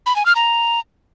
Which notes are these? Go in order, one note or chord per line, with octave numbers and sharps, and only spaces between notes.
B5
G#5
F6
A#5